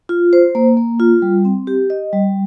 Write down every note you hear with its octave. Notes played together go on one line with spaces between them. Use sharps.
F4
C5
A#3
A#3
F4
G3
C4
G4
D#5
G3